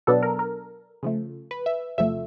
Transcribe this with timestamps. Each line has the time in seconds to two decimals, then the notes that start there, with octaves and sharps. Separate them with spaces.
0.07 B2 F#3 B3 D4 A4
0.23 A#4
0.39 A#4
1.03 C#3 F3 A3
1.51 B4
1.66 E5
1.98 E2 C3 F3 A3 E5